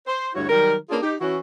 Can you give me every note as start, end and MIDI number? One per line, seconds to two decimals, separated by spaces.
0.07 0.28 72
0.35 0.48 38
0.35 0.48 43
0.35 0.48 64
0.35 0.48 66
0.35 0.48 73
0.49 0.74 51
0.49 0.74 54
0.49 0.74 55
0.49 0.74 70
0.90 0.98 58
0.90 0.98 61
0.90 0.98 62
0.90 0.98 65
0.90 0.98 68
0.90 0.98 71
1.02 1.14 63
1.02 1.14 67
1.21 1.38 52
1.21 1.38 61
1.21 1.38 64
1.21 1.38 66